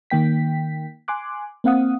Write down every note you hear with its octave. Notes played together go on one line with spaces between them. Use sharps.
D#3 A#3 G5 B6
G#5 C6 D6 F#6
A#3 C4 F5 F#5 D#6